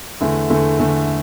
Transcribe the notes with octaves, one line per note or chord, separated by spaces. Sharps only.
E2 D3 A3
E2 D3 A3
E2 D3 A3